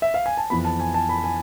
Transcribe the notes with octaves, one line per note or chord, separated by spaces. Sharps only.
E5
F5
G#5
A5
F2 E3 B3 B5
A5
G#5
A5
B5
G#5